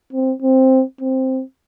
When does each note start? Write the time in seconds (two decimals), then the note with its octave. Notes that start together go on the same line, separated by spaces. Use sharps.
0.13 C4
0.42 C4
1.01 C4